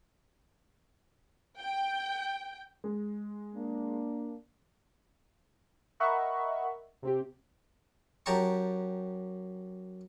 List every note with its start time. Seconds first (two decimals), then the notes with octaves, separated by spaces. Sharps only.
1.59 G5
2.84 G#3
3.54 A#3 D4
6.00 A#4 D#5 E5 F#5 B5 C#6
7.02 C3 C4 G4
8.26 F#2 G4 A5 A#5 C#6